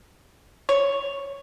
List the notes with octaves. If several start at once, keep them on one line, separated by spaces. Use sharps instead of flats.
C#5